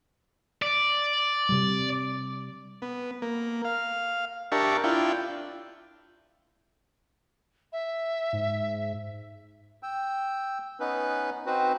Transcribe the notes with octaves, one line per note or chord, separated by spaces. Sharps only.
D5
C3 G3
B3
A#3
F5
D4 G4 A#4 E5 A5 C#6
D4 E4 F4 G5
E5
G#2
G5 E6
B3 C#4 D#4 B4
C4 D#4 F#4 B4 C5